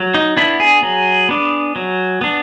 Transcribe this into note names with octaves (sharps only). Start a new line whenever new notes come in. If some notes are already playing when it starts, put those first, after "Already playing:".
Already playing: F#3
D#4
B3 D4 E4
G#4
F#3
B3 D4
F#3
B3 D4